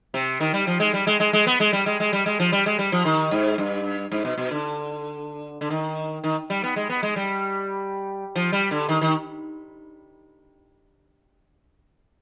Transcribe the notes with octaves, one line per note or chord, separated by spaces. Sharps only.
C3
D#3
G3
F3
G#3
G3
G#3
G#3
G#3
B3
G#3
G3
G#3
G#3
G3
G#3
F3
G3
G#3
G3
F3
D#3
G#2
G2
G#2
B2
B2
D3
D3
D#3
D#3
G3
B3
G#3
B3
G#3
G3
F3
G3
D3
D#3
D#3